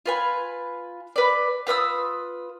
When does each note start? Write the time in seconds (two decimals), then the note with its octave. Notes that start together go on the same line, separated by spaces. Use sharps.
0.06 F4 B4 G#5
1.16 B4 D5
1.67 F4 B4 D#6 E6